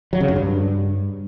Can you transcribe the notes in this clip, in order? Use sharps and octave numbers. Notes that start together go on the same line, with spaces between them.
F#3
C#3
F#2
G2